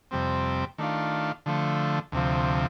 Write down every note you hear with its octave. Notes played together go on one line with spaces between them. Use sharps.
F2 C3 G3 C4
D#3 A3 D4 F4
D3 F3 A3
D2 C3 F3